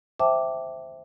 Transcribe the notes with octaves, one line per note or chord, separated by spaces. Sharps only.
C5 E5 G5 A5 D6